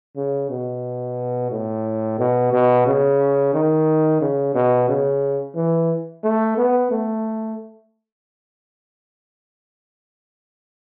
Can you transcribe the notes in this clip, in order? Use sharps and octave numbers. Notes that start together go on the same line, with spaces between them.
C#3
B2
A2
B2
B2
C#3
D#3
C#3
B2
C#3
E3
A3
B3
A3